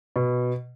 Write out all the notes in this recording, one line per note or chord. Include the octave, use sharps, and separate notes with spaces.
B2